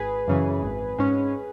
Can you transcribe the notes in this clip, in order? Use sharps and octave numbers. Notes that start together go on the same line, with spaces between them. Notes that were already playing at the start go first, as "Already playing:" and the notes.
Already playing: G#1 G#4 B4
F#2 C#3 E3
G#1
G#2 G#3 C#4